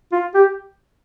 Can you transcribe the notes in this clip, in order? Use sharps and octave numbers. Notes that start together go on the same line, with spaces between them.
F4
G4